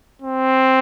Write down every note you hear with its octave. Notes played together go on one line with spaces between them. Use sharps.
C4